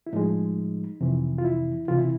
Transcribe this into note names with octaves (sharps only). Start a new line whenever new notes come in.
E4
A2 F3 G#3 D#4
F2 C3 E3
F4
E4
C#2 C3 E3 F4
E4